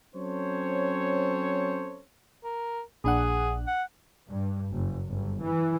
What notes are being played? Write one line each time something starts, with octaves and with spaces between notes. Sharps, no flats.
F#3 C4 C#4 A4 C5 C#5
A#4
A#1 D4 G#4 F#5
F#5
G2
F#1
G1
E3